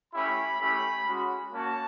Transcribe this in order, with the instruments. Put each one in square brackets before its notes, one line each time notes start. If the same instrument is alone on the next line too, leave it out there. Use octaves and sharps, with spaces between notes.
[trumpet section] A3 C#4 E4 G4 B5
A3 C#4 E4 G4 B5
G#3 C#4 F#4
A#3 C#4 F#4 A5